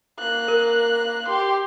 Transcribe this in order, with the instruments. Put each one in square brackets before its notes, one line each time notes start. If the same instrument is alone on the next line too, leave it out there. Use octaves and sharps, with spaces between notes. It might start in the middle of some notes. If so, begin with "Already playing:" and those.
[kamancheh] A#3 F#6
[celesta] A#4
[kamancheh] G4 C6